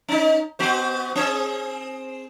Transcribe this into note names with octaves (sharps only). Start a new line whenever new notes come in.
C#4 D#4
B3 F#4 C5
C4 G#4